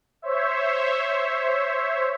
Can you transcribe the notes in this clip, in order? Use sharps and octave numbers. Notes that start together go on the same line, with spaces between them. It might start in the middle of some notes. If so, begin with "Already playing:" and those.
C5 C#5 E5